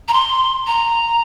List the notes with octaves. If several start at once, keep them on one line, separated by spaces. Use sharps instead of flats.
A#5
C6
A#5